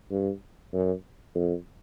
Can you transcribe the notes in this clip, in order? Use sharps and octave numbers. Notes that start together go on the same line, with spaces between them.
G2
F#2
F2